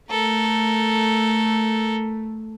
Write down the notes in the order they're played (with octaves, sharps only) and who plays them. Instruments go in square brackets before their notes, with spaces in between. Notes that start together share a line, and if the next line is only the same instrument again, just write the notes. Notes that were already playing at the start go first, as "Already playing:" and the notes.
[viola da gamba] A3 [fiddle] A4 A#4